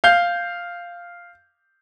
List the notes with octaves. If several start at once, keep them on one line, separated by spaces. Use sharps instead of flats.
F5 G6